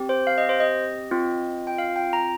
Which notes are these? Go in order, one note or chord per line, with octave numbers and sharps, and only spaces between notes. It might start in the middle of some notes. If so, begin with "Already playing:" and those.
Already playing: C4 G4
C5
F5
D#5
C5
D#5
C4 F4
G5
F5
G5
A#5